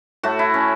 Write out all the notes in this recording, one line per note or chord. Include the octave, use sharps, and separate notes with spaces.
A2 A3 F#4
E4
C#4